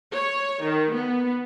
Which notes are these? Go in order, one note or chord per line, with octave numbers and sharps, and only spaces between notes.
C#5
D#3
B3